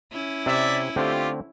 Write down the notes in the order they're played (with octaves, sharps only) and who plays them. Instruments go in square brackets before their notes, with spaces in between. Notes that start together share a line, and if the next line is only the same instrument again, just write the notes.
[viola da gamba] C#4 E4
[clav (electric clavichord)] C3 [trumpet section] D5 E5
[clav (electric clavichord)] D3 A3 C4 [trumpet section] F4 G4